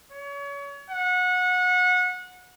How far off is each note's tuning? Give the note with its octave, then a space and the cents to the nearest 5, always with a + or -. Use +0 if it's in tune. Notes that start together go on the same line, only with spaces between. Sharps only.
C#5 +30
F#5 -25